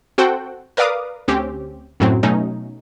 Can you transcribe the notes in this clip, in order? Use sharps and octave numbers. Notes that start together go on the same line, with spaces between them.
C4 F#4 A4 C5 F#5 G5
A#4 B4 D5 F5 D6 D#6
D2 C4 C#4 G4
F#2 A2 F#3 C4
B2 F#3 A3 C#4 D#4